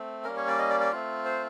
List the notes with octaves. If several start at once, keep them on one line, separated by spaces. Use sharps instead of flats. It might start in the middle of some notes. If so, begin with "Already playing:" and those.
Already playing: A3 C4
G3 A#3 C#4 A#4
C#5
D5
D#5
D5
D5
A3 C4 F4
C5